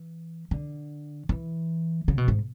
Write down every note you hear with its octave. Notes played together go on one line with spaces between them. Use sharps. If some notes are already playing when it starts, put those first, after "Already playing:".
Already playing: E3
D3
E3
C#3
B2
G#2